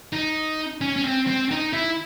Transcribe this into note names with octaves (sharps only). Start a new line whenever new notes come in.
D#4
C#4
C#4
C4
C4
D#4
E4